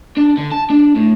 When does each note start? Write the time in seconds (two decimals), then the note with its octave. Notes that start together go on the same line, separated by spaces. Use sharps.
0.17 D4
0.37 D3
0.52 A5
0.70 D4
0.96 A2